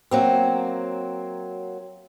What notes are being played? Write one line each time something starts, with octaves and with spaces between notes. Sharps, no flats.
F#3 A#3 C4